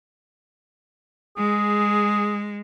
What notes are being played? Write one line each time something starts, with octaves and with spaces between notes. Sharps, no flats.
G#3 G#4